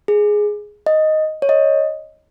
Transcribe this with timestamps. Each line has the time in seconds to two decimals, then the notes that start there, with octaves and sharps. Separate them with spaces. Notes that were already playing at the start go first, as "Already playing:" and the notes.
0.08 G#4
0.86 D#5
1.42 C#5
1.49 D#5